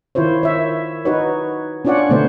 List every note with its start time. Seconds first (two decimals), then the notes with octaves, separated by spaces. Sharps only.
0.15 D#3 E4 F4 C5 C#5
0.43 C#5 E5
1.05 D#4 F#4 B4 C#5
1.85 C#4 D4 F4 C#5 D5 F#5
2.09 B2 D3 A3 B3 C5 C#5